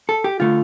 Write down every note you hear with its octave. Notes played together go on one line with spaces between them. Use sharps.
A4
G4
D3 A3 F4